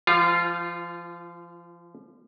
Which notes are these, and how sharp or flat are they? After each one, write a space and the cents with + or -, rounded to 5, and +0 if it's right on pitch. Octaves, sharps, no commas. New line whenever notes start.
F3 -35 F4 +0